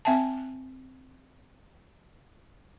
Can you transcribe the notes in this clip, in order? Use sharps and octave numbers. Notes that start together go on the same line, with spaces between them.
C4 E5 G#5 A5